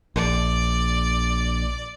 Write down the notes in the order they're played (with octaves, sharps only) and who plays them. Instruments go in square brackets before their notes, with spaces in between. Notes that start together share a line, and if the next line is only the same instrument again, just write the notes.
[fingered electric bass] A#1 [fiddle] D5